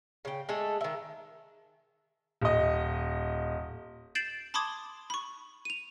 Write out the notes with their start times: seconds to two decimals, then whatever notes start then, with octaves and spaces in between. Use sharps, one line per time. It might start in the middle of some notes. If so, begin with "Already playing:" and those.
0.25 C#3 G5
0.49 G#3 A3 G#4 A4
0.81 D#3 E5
2.42 D#1 D#5
4.15 G6 A6 C7 D7 E7 F#7
4.54 A5 B5 C6 D6 D#6 G#6
5.10 B5 C#6
5.65 D#7 F7